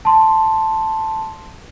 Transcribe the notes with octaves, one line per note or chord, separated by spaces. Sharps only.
A5 C6